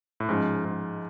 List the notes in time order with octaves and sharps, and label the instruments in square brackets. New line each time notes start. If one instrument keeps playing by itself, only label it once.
[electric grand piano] A2
[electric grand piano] G#2 [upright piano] F3 G#3 C#4
[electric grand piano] G#2